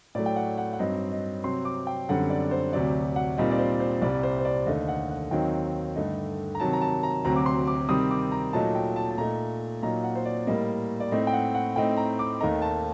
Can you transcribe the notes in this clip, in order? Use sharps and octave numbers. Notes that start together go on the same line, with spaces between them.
A2 F#3 A3 D5
G5
F#5
F#5
F#5
G2 F#3 C4 D#4 D#5
D#5
C3 F#3 C4 C6
D6
G5
F#2 D3 G3 C4 F#5
D5
C5
D2 C3 F#3 D5
F#5
A#2 G3 C4 D#4
D5
C5
C5
C2 C3 G3 D5
C5
C5
D5
D#2 D3 A3 D#4 D#5
F#5
F#5
D#2 D#3 F#3 C4 D#4 G5
G2 D3 A3 D#4
A#5
C3 D#3 F#3 A5
A#5
A5
A#5
D2 C3 F#3 C4 A#5
D6
C6
D6
C3 D#3 G3 C4 D#6
D6
A#5
A#2 F#3 A3 D#4 A5
G5
A5
A5
A#2 A3 D#4 A#5
A#2 F#3 A#3 D#4 A#5
F#5
C5
D5
A2 G3 A#3 D#5
D5
A2 A3 C4 D#4 D#5
G5
F#5
F#5
A2 A3 C4 D#4 G5
A#5
D6
D#2 D#3 A3 D#4 A#5
A5